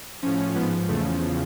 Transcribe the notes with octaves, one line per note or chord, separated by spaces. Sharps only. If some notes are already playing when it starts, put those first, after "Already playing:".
A2 F3 C#4
G#2 F3 B3
E2 C#3 F3 A3